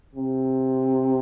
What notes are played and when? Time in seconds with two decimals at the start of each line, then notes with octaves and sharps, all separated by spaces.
0.16 C3